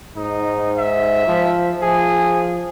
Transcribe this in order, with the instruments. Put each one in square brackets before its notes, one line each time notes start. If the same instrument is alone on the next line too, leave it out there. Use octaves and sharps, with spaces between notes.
[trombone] G#2 [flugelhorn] D#4
[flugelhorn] E5
[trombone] F3
[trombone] F3 [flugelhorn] G#4